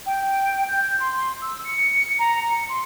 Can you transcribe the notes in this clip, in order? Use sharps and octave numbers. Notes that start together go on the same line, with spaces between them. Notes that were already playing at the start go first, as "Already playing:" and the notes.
G5
G6
C6
E6
C#7
A#5
C#7
C6